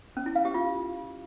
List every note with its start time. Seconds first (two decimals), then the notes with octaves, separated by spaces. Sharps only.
0.17 C#4
0.26 E4
0.35 F5
0.45 G4
0.54 F4